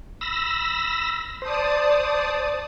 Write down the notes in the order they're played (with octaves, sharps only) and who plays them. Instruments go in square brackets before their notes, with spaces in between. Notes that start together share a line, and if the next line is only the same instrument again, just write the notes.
[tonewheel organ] B5 E6 A#6
[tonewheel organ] C5 [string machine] D5 A5 D#6